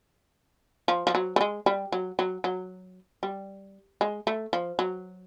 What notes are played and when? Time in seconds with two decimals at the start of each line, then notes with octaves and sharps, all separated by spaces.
0.88 F3
1.07 F3
1.15 F#3
1.36 A3
1.41 G#3
1.66 G3
1.92 F#3
2.19 F#3
2.44 F#3
3.23 G3
4.01 G#3
4.27 A3
4.53 F3
4.79 F#3